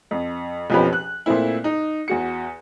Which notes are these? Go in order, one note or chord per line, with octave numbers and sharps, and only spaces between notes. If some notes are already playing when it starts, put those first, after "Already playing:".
F2
B1 F2 F3 C#4 G4 B4
F#6
A#2 A3 C4 E4
D#4
E2 F#4 C#7